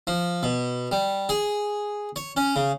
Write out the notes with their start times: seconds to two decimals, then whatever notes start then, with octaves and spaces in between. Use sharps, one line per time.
0.07 F3
0.43 B2
0.92 G3
1.29 G#4
2.16 C#5
2.37 C#4
2.56 C#3